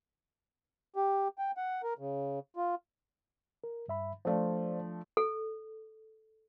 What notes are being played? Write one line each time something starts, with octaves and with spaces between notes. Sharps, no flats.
G4
G5
F#5
A#4
C#3
F4
A#4
G2 E5 B5
F3 A3 D4 C5 D5 F5
A4